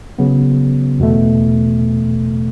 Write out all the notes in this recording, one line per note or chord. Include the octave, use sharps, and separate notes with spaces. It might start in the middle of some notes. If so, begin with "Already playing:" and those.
C#3 F#3 B3
E2 B2 A3